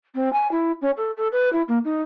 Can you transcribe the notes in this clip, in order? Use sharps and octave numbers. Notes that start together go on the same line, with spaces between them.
C4
G#5
E4
C#4
A4
A4
B4
E4
A#3
D#4